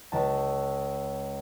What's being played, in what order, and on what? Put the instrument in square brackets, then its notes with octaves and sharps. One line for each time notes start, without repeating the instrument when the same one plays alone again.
[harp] C#2 A5